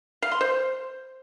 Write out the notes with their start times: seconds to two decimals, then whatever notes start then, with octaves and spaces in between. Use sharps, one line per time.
0.22 F5
0.32 C6
0.41 C5